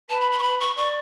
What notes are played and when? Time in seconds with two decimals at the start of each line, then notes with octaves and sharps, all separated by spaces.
0.10 B4 A5
0.21 B5
0.32 B5
0.39 C#6
0.43 B5
0.60 C#6
0.77 D5 C#6